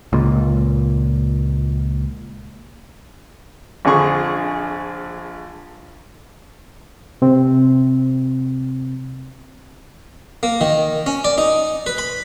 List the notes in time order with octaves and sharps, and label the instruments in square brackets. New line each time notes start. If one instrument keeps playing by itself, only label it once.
[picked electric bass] C#2 A#2
[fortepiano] A#1 F2 D3 G#4 C#6
[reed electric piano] C3 C4
[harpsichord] A#3
D#3
C#4
D5
D#4
B4
B5